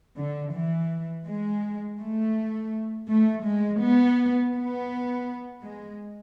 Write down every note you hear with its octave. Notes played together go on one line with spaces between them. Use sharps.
D3
E3
G#3
A3
A3
G#3
B3
B3
G#3